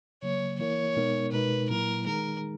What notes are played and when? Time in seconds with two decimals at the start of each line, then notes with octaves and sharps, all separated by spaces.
0.23 C#3 F#3 A#3 C#5
0.59 E3 A#3 E4 A#4 C#5
0.96 B2 G#3 B3 D#4 A#4
1.32 B2 G#3 D#4 A#4 B4
1.70 A#2 F#3 A#3 E4 A#4
2.06 D#3 G#3 D#4 G#4 A#4